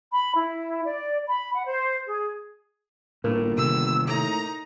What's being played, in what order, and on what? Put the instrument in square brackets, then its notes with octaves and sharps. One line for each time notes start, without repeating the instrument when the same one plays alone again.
[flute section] B5
E4
D5
B5
F#5
C5
G#4
[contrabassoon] G1 [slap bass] A2 [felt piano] A#3
[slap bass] C3 D#3 [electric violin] E6
[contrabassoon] A2 [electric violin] D#4 A#5